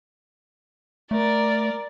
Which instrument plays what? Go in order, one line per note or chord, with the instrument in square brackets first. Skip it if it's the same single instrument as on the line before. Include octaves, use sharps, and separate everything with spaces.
[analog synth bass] A3 [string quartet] A#4 D5